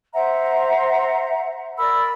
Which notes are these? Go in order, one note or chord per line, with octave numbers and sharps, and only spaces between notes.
C5 E5 F#5 A#5
A#4 D5 B5 E6